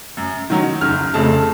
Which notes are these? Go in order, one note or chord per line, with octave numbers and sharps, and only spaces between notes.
F#2
D#3 F#3
F#1 F6
F2 C#3 A3 A5